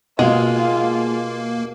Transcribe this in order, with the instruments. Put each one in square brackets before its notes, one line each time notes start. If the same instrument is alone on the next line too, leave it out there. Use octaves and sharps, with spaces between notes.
[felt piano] B2 [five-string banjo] G#3 [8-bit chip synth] A#3 [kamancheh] F4